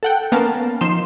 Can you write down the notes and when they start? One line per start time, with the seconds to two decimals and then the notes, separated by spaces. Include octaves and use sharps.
0.03 A4 F#5 G5
0.32 A#3 B3 C#4 A#4 F5 A5
0.81 F3 D#4 C6 E7